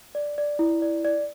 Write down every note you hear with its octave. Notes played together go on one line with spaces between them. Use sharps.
D5
D5
E4
D5
D5